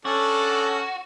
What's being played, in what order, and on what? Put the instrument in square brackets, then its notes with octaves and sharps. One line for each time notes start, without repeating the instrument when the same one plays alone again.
[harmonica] C#4 A4 [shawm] D4 [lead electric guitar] F#4